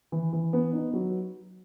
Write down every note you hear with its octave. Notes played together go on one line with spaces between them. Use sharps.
E3
E3
B3
D#4
F#3